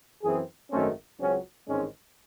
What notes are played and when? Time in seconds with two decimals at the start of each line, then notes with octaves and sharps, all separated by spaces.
0.23 F#2 E3 C4 G#4
0.71 G#1 F#2 D#3 A3 C4 C#4
1.19 C#2 C#3 F#3 C4 C#4
1.67 A1 G#2 D#3 G#3 C4 C#4